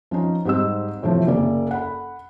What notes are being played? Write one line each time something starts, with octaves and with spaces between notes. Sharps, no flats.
F3 C#4 D#4
G#2 G3 C4 D#5 E6
A2 C3 E3 F3
F#1 A#3 D5
A4 F#5 B5